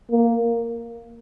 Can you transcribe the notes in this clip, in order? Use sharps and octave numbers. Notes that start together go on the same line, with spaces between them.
A#3